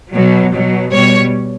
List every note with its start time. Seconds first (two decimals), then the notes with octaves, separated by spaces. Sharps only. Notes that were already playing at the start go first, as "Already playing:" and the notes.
0.13 B2 F#3
0.53 B2 F#3
0.92 B2 G3 C#5